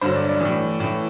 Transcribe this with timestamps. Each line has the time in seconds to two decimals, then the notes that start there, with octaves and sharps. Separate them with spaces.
0.01 G2 D3 F#3 C5
0.15 D5
0.28 D5
0.41 A2 E3
0.80 A2 E3